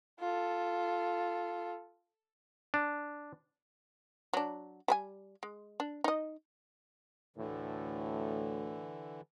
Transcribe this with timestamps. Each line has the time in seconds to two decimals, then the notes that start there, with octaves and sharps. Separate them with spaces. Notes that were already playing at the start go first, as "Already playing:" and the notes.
0.20 F4 A4
2.74 D4
4.33 F#3 D4
4.88 G3 B4 G#5
5.43 G#3
5.80 D4
6.04 D#4 D#5
7.37 D2 A2 D3 E3